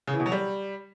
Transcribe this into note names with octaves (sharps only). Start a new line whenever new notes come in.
C#3
E3
B2
F#3
G3